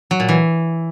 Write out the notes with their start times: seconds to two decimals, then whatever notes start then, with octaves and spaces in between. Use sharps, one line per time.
0.11 F#3
0.20 A#2
0.29 E3